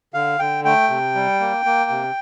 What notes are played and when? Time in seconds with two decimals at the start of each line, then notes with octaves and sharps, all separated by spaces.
0.14 D3 F5
0.39 D3 G5
0.65 A3 G5
0.89 C3
1.15 G3
1.40 A#3
1.65 A#3
1.90 C3